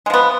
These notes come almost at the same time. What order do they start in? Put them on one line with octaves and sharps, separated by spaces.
G#3 F3 B3